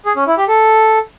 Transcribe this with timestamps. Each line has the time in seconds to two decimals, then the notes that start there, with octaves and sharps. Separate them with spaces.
0.05 G#4
0.16 C#4
0.27 E4
0.38 G4
0.48 A4